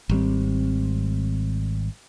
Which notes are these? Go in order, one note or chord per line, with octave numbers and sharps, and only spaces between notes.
G#1 G3 C4